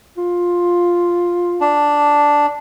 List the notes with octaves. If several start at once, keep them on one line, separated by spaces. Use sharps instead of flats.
F4
D4